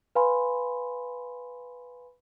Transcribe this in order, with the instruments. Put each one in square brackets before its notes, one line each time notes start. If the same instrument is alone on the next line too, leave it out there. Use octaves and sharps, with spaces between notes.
[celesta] B4 F5 G#5 B5 C6